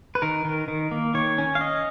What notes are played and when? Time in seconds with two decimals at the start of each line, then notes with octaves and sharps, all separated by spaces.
0.15 B4
0.22 D#3 A#4
0.45 D#3
0.68 D#3
0.91 A#3
1.14 D#3 C#5
1.38 C#4
1.55 F5
1.61 C#4 D#5